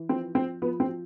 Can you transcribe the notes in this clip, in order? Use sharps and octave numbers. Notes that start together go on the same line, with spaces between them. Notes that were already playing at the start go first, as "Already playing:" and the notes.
Already playing: E3
F3 C4
F3 C4
F3 B3
C4
F3